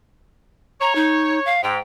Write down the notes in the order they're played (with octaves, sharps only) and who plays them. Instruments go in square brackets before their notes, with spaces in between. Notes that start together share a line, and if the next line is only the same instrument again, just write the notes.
[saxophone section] C#5 [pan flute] A#5
[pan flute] D#4
F5
[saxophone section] G#2 [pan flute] G5